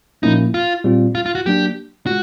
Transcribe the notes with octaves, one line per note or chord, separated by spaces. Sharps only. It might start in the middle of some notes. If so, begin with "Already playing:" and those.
A#2 F3 A#3 C#4 D#4 E4
F4
A#2 G3 C4 F4
F4
F4
F#4
F#3 A#3 D4 G4
G#3 F4 F#4